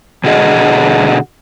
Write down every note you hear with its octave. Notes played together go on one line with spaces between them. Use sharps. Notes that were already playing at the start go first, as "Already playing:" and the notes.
B2 D3 F#4 G#4 D#5